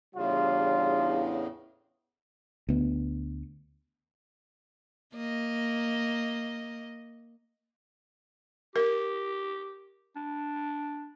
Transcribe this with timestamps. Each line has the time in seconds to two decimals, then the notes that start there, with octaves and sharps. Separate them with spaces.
0.15 E2 A2 C#3 G3 D4 F4
2.69 D2 B3
5.14 A#3 D#5
8.76 G4 A#4
10.16 D4